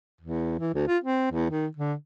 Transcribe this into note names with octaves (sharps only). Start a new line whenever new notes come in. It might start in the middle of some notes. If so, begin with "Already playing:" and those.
E2
E3
D2
F4
C4
E2
D#3
D3